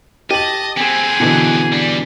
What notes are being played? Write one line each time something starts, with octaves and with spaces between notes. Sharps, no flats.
G4 D#5 A5 F#7
B3 C4 G#4
B2 D3 E3
G3 D4